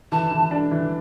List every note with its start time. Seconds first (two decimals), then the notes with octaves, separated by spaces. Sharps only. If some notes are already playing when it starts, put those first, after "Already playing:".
0.12 E3 A5
0.31 E3
0.51 D4
0.72 E3